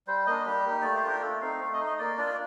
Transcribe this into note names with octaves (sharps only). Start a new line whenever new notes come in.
G3 C5
A#3 D4 D#5
G3 G4
A#3 D#4
A3 D5
C5
D4 F4 A#4
A3 A4
C4 D#4 F5
A3 F5
D#5
D#4
D#5
A#3 D5
D4 F4 D5